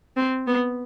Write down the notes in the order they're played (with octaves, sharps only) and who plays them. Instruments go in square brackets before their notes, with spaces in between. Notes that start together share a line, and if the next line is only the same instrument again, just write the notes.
[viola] C4
B3